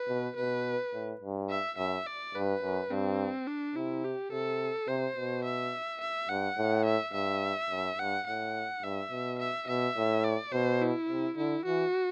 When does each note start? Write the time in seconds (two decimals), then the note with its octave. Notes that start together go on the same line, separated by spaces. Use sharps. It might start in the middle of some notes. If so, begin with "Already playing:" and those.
Already playing: B4
0.08 B2
0.36 B2 B4
0.94 A2
1.21 G2
1.49 E5
1.78 F#2 E5
2.06 D5
2.35 G2 B4
2.62 F#2
2.90 G2 C4
3.47 D4
3.76 C3 E4
4.04 G4
4.32 C3 A4
4.88 C3 C5
5.16 B2
5.45 E5
6.01 E5
6.29 G2 F#5
6.57 A2
6.85 E5
7.13 G2 E5
7.70 F#2
7.99 G2 F#5
8.27 A2 F#5
8.83 G2 E5
9.11 B2
9.39 E5
9.68 B2 E5
9.97 A2
10.24 D5
10.52 B2 C5
10.81 E4
11.09 C3
11.36 D3 E4
11.65 E3 F#4